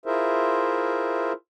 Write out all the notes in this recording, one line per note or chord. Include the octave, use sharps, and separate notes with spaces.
E4 F4 G#4 A#4 C5 E5